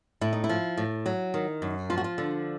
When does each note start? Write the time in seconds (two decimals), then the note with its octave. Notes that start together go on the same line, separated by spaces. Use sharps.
0.21 A2 E4
0.33 D#4
0.44 E4
0.49 F3
0.77 A2
1.06 F#3
1.34 D#3
1.62 F#2
1.90 F3 F4
1.98 F#4
2.04 F4
2.18 D3